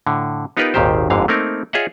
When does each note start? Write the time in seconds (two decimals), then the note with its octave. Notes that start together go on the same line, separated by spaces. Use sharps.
0.07 A2 D3
0.57 B3 D#4 F4 G4 A#4 B4
0.74 G#1 D#2 A#2 D#3 G4 C5
1.10 G1 F2 G#2 D3 F5
1.28 A3 A#3 C4 D#4 A#4
1.73 F4 G#4 C#5 D#5 E5 F#5